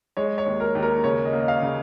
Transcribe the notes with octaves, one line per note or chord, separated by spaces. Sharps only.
G#3 C#5
C#5
D#2
A#4
D#2
A#4
C#3 C#5
D#5
A#3
D#5
F5
C#3